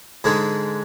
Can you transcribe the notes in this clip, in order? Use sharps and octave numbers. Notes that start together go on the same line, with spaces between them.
G#2 D3 G#3